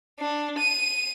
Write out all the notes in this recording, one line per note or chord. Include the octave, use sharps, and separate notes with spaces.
D4
D#7